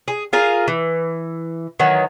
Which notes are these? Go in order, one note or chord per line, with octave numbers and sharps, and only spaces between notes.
G#4
F4 G#4 A#4 F5
E3
D#3 E3 F#3